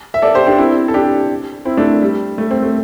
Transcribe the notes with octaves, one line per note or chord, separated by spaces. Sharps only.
E5
A4 D5
G4 C5
D4 G4
C4 E4
A4
D4 G4
C4 E4
A3 D4
G3
A3
C4
A3